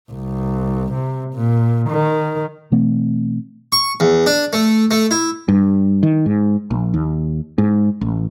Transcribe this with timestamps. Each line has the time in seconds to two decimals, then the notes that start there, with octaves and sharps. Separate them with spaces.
0.11 C2
0.93 C3
1.34 A#2
1.89 D#3
2.72 B2 E3 A3 C4
3.72 C#6
4.00 E2
4.26 D4
4.53 A3
4.91 A3
5.11 E4
5.48 G2
6.03 D#3
6.26 G#2
6.71 A#1
6.94 D#2
7.58 G#2
8.01 A1